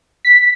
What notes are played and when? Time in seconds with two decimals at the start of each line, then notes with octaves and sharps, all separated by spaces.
0.25 B6